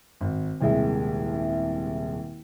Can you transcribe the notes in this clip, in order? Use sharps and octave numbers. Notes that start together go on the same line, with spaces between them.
G#1
D#1 C2 G#3 E5